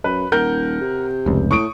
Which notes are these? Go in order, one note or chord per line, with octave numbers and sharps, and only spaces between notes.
F#2 B4
D#1 A#4 F#5 G6
C3
F1 C#2
A2 C#6 D#6 D7